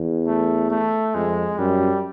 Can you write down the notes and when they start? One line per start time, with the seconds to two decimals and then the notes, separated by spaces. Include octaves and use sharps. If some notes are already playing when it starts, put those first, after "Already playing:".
Already playing: E2
0.27 A3
0.70 A3
1.14 F2 G#3
1.58 F#2 G3